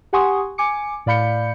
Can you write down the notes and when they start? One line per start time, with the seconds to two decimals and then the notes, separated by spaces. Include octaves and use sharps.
0.13 G4 F#5 G#5 C6 C#6 D#6
0.58 G#5 D6 C#7
1.06 A2 D5 F5 B5 G6 C#7